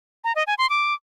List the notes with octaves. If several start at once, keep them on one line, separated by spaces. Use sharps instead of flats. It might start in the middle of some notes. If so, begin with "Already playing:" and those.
A#5
D#5
G#5
C6
D6